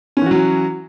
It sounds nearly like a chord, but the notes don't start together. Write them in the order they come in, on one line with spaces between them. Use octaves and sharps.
C#4 E3 F#4 F#3